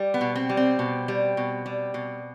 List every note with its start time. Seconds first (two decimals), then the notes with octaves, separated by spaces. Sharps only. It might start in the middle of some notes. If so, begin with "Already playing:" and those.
Already playing: G3
0.14 B3
0.21 B2
0.36 C4
0.49 G3
0.57 C4
0.79 B2
1.08 G3
1.37 B2
1.66 G3
1.94 B2